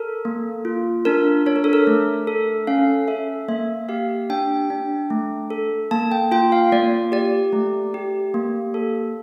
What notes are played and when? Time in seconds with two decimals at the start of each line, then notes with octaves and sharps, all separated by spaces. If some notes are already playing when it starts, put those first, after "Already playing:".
Already playing: A4 A#4
0.25 A#3
0.65 F4
1.05 D4 A#4
1.46 D4 C#5
1.56 A#4
1.64 A4
1.73 A#4
1.87 A3
2.27 A4
2.67 C#4 F5
3.08 A4 E5
3.48 A#3 E5
3.89 G4 F5
4.30 D4 G5
4.70 D4
5.10 A3
5.50 A4
5.91 A#3 A5
6.12 G5
6.32 F4 G5
6.52 F5
6.72 A#3 D5
7.12 G4 D5
7.53 A3
7.94 G4
8.34 A#3
8.74 A4